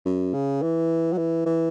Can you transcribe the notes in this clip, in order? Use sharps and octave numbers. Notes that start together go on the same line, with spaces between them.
F#2
C#3
E3
F#3
E3
E3